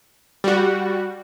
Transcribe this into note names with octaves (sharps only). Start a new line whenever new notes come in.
G3 F#4